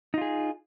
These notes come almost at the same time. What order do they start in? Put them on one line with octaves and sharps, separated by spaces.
D#4 F4 G#4